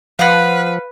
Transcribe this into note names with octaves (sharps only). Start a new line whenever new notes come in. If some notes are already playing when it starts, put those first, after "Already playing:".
F3 B4 F5 F#5